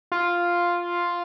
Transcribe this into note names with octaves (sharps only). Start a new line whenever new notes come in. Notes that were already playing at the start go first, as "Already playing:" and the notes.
F4